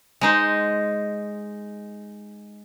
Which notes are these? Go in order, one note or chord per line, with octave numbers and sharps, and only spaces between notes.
G#3 D#4 C5